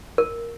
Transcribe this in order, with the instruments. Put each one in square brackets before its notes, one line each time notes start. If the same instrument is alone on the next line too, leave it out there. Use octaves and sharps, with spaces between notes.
[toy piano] A#4